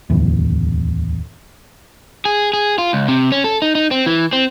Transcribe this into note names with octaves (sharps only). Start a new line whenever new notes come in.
D1 E2
G#4
G#4
F4
C#2
C3
C#4
A4
D#4
D#4
C4
E3
C4